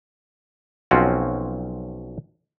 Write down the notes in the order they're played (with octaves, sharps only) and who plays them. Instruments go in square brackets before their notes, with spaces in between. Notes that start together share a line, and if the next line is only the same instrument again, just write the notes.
[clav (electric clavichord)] B1 F3 C4 C#4 F4 F#4